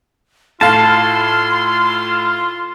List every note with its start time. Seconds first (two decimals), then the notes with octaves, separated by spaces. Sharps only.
0.61 A2 F4 F5 A5 C6